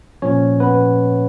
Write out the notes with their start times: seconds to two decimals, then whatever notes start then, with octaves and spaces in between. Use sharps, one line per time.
0.22 A#2 F3 C#4 C#5
0.60 B3 B4